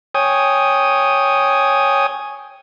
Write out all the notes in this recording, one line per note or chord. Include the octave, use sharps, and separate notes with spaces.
C#5 G5 G#5 D#6